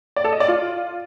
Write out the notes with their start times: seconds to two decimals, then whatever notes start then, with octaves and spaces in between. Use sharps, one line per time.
0.16 D5
0.24 A4
0.32 D#5
0.40 D5
0.48 F4